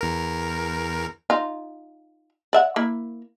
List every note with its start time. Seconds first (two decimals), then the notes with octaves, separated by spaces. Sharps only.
0.01 E2 A#4
1.30 D#4 F4
2.53 D5 E5 F#5
2.76 A#3 E4